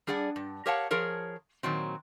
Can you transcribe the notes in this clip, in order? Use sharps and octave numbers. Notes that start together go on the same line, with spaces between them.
G3 D4 G#4 D5 F#5
G2
G4 A#4 C#5 F5 F#5 A5
F3 G#4 A#4 C#5
A#2 D#3 F#3 C4